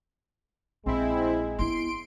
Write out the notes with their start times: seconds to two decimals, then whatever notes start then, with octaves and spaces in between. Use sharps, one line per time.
0.86 A#1 G#3 C4 E4
1.58 B3 E4 C6 D7